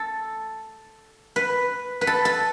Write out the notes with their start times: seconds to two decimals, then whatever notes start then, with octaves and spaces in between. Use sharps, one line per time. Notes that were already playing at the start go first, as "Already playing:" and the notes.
Already playing: A4
1.36 B4
2.01 B4
2.07 A4
2.25 A4